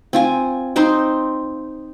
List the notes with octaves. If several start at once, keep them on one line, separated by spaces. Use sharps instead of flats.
C4 F4 G#5
C4 D#4 C5 C6